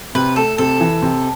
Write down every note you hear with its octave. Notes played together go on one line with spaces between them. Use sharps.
C3 B4
A3 A4
C3 A4
E3
C3